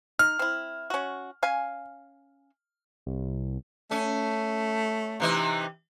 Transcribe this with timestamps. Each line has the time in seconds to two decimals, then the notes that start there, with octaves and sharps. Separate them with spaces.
0.19 D#4 F6
0.39 C4 E4
0.90 C#4 F#4
1.43 C#4 F5 G#5
3.06 C2
3.91 A3 C#4
5.20 C3 E3 D#4